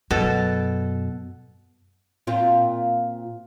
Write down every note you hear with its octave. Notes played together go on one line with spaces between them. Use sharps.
F#2 B2 A4
A#2 C4 F4